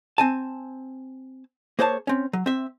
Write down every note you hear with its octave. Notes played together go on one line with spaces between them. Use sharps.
C4 G#5 A5
A#3 G#4 C5 C#5 F5 A5
C4 C#4
F#3
C4 E5